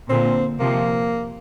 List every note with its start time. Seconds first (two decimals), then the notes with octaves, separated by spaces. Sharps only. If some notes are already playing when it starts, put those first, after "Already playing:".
0.09 A#2 D3 C4
0.60 C3 F3 A#3